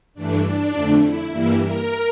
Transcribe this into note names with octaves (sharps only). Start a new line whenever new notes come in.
G2 E3 A3 D4
D4
F2 D3 A3
E4
G2 E3 G3 A#3 E4
A#4